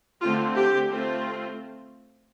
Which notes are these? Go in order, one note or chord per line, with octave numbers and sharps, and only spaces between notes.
D3 A3 C4 F4
G4
A3 C4 F4